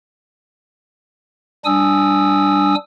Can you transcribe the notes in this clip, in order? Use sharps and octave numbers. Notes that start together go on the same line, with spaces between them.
G3 D4 G#5 D#6 E6